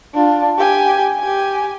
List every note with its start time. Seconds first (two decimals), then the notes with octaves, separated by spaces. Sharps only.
0.14 D4 F4
0.58 G4 G#5
1.20 G4 G#5